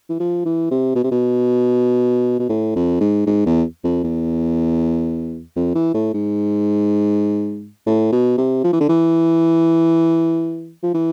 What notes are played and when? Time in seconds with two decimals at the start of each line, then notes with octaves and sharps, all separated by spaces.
0.09 E3
0.20 F3
0.45 E3
0.71 C3
0.95 B2
1.04 C3
1.11 B2
2.40 B2
2.49 A2
2.75 F2
3.00 G#2
3.26 G#2
3.46 E2
3.84 F2
4.04 E2
5.56 F2
5.75 E3
5.94 A2
6.14 G#2
7.87 A2
8.12 B2
8.37 C3
8.64 F3
8.73 E3
8.80 D3
8.89 E3
10.83 F3
10.94 E3